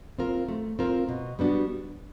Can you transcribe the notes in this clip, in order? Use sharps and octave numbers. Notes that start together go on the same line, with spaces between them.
C4 F4 A#4
A3
C4 F4 A#4
B2
G3 B3 D4 F#4